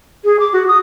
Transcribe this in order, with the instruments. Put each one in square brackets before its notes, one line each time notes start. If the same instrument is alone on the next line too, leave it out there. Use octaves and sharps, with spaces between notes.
[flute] G#4
D6
F#4
D#6